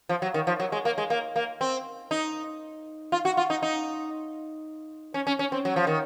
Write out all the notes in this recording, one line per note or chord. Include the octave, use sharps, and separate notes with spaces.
F3
F#3
D#3
F3
F#3
G#3
A#3
G#3
A#3
A#3
C4
D#4
F4
F#4
F4
D#4
D#4
C#4
C#4
C#4
C4
F#3
F3
D#3